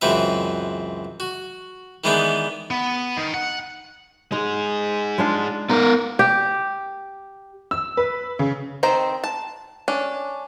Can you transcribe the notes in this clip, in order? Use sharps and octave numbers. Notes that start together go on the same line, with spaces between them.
C#2 F#2 E3 C4 B4 E5
F#4
D#3 E3 G#3 B3 D4 D#4
B3
D#3
F#5
G#3 D#4 G#4
G#3 D4 F4
B3 D#4 A#4
G4
E6
B4
C#3
D#3 C4 C5 A#5
A5
C#4 D4